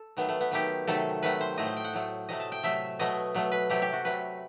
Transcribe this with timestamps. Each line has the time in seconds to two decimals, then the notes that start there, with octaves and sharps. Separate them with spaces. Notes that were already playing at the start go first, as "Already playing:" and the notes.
Already playing: A4
0.17 D#3 F#3 A3 B3
0.29 A3
0.41 B3
0.51 D#3 F#3 A3 G4
0.87 C3 D#3 F#3 A3 A4
1.23 C3 D#3 F#3 A3 B4
1.41 C5
1.58 A2 F#3 A3 D#5
1.66 C5
1.76 G5
1.84 F#5
1.93 A2 F#3 A3
2.29 C3 F#3 A3 D#5
2.40 A5
2.52 G5
2.63 C3 F#3 A3 E5
2.99 B2 F#3 A3 D#5
3.35 B2 F#3 A3
3.52 B4
3.70 C3 F#3 A3 G4
3.82 G4
3.93 F#4
4.05 C3 F#3 A3 B4